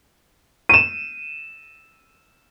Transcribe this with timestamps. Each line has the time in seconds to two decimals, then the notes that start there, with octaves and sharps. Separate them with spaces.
0.69 D#7 E7